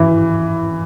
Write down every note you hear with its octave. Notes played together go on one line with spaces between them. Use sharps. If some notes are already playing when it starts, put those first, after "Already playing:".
Already playing: E3